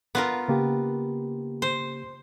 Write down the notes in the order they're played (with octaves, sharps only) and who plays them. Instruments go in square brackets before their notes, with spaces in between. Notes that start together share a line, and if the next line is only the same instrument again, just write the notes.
[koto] B3 F4 A#4
[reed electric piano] C#3 A#3 G4
[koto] C5